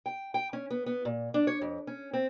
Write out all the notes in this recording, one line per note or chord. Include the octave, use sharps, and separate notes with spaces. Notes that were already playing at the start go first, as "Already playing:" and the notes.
G5
G5
C#4
B3
B3
A#2
D4
C#5
F2
C#4
C4